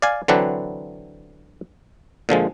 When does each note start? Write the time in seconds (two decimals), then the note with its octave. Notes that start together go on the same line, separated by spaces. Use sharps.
0.02 D5 F5 G#5
0.28 D3 E3 F#3 C4 D4 B4
2.29 A#2 D3 F3 G#3